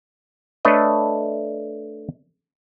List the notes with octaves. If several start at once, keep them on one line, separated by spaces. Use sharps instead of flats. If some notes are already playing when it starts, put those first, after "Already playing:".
A3 D4 A4 B4 C#5 D#5